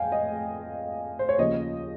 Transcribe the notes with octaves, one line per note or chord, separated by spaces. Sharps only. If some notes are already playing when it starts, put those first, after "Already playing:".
Already playing: F2 F5 G5 G#5
D#5
C5
C#5
D#2 C#3 F3 D#5